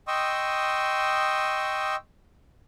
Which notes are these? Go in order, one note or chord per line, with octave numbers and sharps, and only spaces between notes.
D#5 G5 C6 C#6 D#6 E6